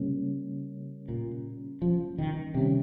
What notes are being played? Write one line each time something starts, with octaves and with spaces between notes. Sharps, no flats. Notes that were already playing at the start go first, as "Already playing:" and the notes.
Already playing: C#3 G3 A#3 C#4
A#2
F3
D#3
C3 D#3 G3 C#4